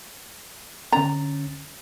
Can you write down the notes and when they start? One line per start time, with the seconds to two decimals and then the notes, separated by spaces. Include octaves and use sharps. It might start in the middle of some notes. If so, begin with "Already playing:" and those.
0.92 D3 C#4 A#5 A6